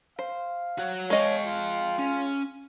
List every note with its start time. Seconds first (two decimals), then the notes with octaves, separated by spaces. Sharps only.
0.19 C5 F5
0.78 F#4 C#5
1.10 G#3 C#5 D#5 F5 G5
1.46 F4
1.99 C#4